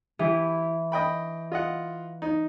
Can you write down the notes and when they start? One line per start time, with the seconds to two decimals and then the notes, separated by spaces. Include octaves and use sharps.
0.19 E3 E4 G4
0.92 D#5 G5 B5
1.52 F4 D#5 F#5
2.22 D#4